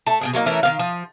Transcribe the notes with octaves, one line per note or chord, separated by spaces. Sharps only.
A3 A5
B2 D#3 G#4
F#3 A3 A#3 D#4
E3 A3 C#4 A#4
D#3 A#3 F5
F3